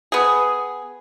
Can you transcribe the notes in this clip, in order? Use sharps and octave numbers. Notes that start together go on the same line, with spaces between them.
B3 G#4